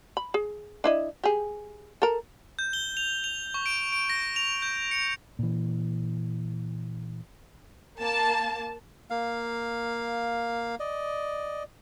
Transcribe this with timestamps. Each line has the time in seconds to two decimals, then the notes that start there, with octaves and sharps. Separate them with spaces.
0.17 B5
0.34 G#4
0.84 D4 E4 D#5
1.24 G4 G#4
2.02 A4 A#4
2.59 G6
2.73 G7
2.97 F7
3.24 F7
3.54 C#6
3.66 D7
3.93 D7
4.10 A#6
4.36 F7
4.62 G6
4.91 C#7
5.39 A#2 E3
7.99 A#3 A5
9.10 A#3 F5
10.80 D5 D#5